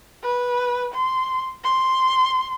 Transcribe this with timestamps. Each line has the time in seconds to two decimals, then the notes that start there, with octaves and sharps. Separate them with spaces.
0.23 B4
0.94 C6
1.64 C6